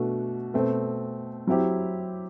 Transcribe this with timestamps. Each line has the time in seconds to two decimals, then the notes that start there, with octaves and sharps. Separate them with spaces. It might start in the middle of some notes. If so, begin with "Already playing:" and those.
Already playing: B2 A3 D4 F#4
0.54 B2 A3 C4
1.47 F#3 C4 E4 G4